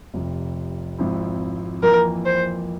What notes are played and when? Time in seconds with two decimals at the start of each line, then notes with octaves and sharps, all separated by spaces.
0.14 F1 F2 C3
0.99 G#1 G#2 F3 C4 E4
1.83 F2 E3 A#3 A#4
2.25 C5